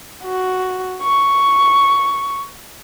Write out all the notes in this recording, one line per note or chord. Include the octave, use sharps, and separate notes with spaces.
F#4
C#6